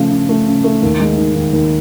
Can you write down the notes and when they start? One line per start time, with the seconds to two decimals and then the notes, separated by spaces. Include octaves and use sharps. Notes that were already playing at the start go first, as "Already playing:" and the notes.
Already playing: C#3 F3 A3
0.12 C#3
0.29 A3
0.47 C#3
0.64 A3
0.82 D#2
1.00 G#3
1.18 D#3
1.36 D#2
1.53 D#2